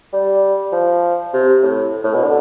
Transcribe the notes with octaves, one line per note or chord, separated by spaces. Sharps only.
G3
F3
C3
A2
A2
B2
D3